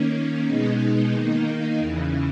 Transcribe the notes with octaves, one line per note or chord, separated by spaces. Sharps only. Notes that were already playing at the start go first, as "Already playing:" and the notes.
Already playing: D#3 A#3 C#4
B2 G#3 B3 D#4
D#3 A#3 D#4
E2 C#3 E3